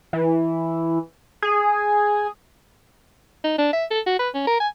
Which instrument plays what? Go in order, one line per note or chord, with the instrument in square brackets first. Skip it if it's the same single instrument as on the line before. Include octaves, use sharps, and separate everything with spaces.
[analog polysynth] E3
G#4
[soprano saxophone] D#4
D4
E5
A4
F#4
B4
C#4
A#4
G#5